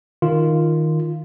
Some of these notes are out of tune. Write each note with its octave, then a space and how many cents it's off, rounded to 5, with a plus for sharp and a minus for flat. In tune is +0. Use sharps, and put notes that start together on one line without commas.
D#3 +0 F4 -10